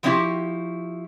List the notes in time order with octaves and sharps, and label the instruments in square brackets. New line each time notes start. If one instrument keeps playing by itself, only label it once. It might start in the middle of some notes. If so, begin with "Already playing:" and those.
[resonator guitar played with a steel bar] F3 G3 C4 E4 F#4 G4